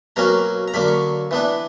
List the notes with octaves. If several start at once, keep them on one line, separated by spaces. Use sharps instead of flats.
B2 F#3 A#3 C#4 A#5
A#5
D3 F#3 A#3 B5
C#6
E3 B3 D4